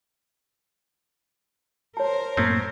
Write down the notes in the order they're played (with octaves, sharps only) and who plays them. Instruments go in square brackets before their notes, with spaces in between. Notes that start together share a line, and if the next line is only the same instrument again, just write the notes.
[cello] A#4 C5 [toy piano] C#5 A5
[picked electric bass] F#2 A2 A#3 [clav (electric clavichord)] C4 C#4